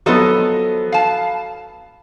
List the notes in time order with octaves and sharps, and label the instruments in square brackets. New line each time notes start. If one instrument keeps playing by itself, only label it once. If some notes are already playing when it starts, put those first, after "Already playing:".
[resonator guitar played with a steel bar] F3 A4 D#5 [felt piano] F#3 B3
[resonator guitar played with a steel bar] F5 A5